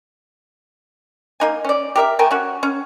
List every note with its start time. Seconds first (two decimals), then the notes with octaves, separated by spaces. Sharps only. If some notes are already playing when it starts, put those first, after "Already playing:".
1.40 A#3 D#4 G#5
1.65 C#4 D5
1.96 G4 A#4 E5
2.19 A3 A#4 G5 G#5
2.31 C#4 F#4
2.63 C#4